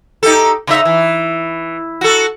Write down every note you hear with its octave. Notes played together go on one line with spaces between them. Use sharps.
D#4 G4 A4
C#3 D#4 E5
E3
F#4 A4